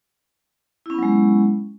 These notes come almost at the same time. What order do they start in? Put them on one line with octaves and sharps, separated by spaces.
E4 C#4 B3 F#3 G#3